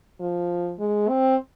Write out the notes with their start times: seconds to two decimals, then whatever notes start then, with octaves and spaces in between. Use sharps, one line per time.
0.21 F3
0.79 G#3
1.09 C4